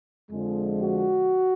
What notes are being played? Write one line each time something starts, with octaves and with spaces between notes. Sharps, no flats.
F2 D3 F3 G#3
F#4